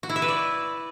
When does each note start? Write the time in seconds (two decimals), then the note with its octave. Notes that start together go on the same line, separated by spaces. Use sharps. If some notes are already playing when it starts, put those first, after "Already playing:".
0.03 F#4
0.09 E4
0.16 E5
0.22 B4
0.28 D5